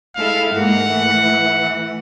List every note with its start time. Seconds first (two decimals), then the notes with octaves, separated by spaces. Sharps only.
0.15 G#3 E4 A4 F5
0.52 G#2 G#3 A#3 F#5
0.84 E3 A3